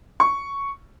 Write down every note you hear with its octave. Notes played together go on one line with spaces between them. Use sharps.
C#6